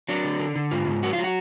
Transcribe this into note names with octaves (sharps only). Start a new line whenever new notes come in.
F#3 D4
D3
D3
D3
G#2 F4
G#2
F#3 F#4
F4
F#3
F#4